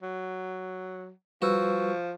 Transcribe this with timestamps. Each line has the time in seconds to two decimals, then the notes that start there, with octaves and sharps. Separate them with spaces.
0.02 F#3
1.42 F3 G3 F#4 B4 E6